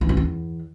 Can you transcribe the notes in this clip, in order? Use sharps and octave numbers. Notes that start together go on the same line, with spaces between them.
E3
F#2
E2